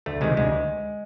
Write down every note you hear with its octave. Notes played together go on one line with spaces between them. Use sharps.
D2 A3
C3 D#3 G#3
D2 G#3